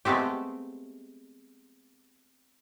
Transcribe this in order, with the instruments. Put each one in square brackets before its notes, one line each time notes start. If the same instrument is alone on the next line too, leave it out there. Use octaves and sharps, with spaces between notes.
[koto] G#3 A3 B3 C4 G4